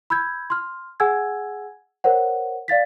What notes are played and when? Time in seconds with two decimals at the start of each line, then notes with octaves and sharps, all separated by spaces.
0.10 B5 E6 G6 G#6
0.50 C6 F6
1.00 G#4 F#5 G#5 E6 G#6
2.04 A#4 C5 C#5 F#5
2.68 D5 F5 A6 B6